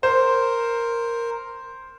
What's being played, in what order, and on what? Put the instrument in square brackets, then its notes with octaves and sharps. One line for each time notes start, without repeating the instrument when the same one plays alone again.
[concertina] A#4 [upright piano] C5